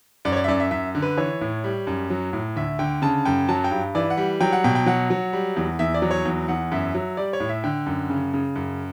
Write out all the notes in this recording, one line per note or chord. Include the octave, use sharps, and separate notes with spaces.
F#2 D5
C#5
D5
E5
F#2 D5
E5
F#2 E5
D3
B4
E3 C#5
A2
G3
F#2
F#3
A2
D2 E5
D3 G5
C#3 A5
F#2 G5
F#3 A5
G5
G2
E3 D5
F#5
G3
F#3 G5
F#5
B2 G5
G5
F#3 F#5
F#3
G3
E2
E2 E5
D5
F#3
C#5
E2
E2 F#5
F#2 E5
F#3
G3 D5
C#5
A2
E5
D3 G5
F#2
C#3
C#3
F#2